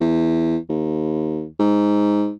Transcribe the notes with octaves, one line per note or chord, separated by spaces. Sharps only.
E2
D#2
G#2